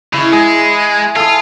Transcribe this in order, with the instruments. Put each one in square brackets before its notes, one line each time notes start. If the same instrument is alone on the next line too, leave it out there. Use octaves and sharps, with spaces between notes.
[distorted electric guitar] C#3 [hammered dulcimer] E4 C#6
[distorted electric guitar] G#3 [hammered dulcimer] G#4
[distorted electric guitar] F4 [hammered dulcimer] G#4 A4